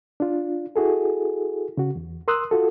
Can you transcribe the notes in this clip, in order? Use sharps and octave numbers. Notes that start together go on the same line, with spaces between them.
D4 F4
E4 F#4 G#4 A4
C#3 F#4
E2
A#4 C6 D#6 E6 F#6
F4 F#4 A4